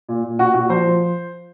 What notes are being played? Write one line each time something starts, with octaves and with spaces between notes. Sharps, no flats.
A#2
A#2
A#2 F#4
A#2 F#4
F3 C5
F3